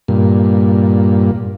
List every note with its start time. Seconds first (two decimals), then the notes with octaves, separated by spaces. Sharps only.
0.08 G2 A#2